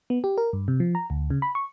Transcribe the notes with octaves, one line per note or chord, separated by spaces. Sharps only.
B3
G4
A#4
G2
C3
F3
A#5
D2
C#3
B5
C#6